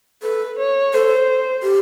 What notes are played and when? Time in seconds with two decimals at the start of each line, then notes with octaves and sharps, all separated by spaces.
0.23 A4 B4
0.58 C#5
0.93 A4 C5
1.63 G4